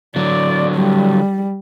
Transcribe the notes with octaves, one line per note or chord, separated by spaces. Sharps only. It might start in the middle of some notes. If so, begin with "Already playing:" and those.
D3 F#3 D5
G3